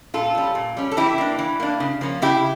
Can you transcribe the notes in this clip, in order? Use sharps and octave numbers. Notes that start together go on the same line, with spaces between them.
A#2 F4 A4
G3 C#4
A#2
G3 C#4
A4
E3 E4 G4
A#3 D4
E3
A#3 D4
C#3
F3 A#3 C#4
C#3 E4 G4